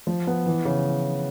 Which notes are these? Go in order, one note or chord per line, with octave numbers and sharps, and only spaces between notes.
F3
B3
E3
C#3